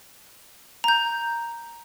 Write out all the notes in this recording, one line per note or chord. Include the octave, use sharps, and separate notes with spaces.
A#5 G6